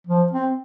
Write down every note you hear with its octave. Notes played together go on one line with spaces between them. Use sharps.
F3
C4